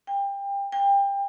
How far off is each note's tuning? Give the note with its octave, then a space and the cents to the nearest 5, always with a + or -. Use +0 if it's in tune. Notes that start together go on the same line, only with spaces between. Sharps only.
G5 +25
G5 +25